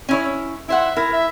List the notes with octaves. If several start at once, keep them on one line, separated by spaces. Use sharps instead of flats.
C#4 E4 C#5
E4 C5 E5 F#5
E4 A#4
E5